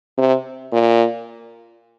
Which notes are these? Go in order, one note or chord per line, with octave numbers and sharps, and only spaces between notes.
C3
A#2